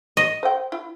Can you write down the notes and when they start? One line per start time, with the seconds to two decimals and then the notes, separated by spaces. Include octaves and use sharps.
0.17 D#5
0.43 C5 G5
0.72 E4